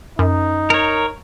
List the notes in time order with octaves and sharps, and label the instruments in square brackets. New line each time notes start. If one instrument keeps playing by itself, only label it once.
[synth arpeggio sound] F#2 [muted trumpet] D#4
[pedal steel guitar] A#4 C#5